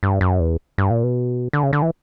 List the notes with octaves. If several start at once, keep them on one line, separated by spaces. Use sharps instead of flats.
G2
F#2
E2
G2
A#2
B2
D3
C#3
D3
E3